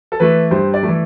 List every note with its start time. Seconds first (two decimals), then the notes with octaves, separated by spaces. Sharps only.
0.12 A4
0.20 E3 A3 B4
0.51 G2 C5
0.74 D5
0.83 A3
0.88 E3